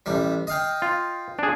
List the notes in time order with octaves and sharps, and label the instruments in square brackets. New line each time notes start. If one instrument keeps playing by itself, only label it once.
[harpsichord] A1 G3
D#5 F5 G5
[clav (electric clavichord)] F4
D4 G#4